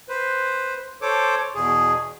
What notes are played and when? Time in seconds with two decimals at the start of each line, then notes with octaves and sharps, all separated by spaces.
0.09 B4 C5
1.02 A4 C5 C#5 D6
1.55 E2 B2 G#4